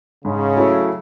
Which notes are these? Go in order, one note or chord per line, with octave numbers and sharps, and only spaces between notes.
G#2 C#3
F#3 A3 C#4 E4